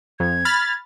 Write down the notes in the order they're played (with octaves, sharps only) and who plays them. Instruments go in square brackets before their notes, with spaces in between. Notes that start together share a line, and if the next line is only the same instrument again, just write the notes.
[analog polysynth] F2 [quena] G#6
[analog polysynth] B5 F6 A6